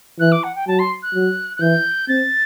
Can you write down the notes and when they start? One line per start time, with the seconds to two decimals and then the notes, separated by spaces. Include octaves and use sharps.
0.20 E3 F#6
0.32 D6
0.44 F#5
0.55 G5
0.67 F#3 A5
0.79 C6
1.03 F#6
1.14 F#3
1.57 F#6
1.61 E3 G6
2.08 C4 A6